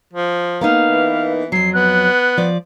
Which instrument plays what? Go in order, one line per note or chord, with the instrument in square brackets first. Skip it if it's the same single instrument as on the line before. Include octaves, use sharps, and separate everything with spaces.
[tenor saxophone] F3
[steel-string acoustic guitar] A#3 B3 D#4 [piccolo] F5
[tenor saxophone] E3
[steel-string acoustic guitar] F2 F#3 [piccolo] C7
[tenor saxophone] B3 [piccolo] F#6
[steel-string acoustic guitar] F3 D5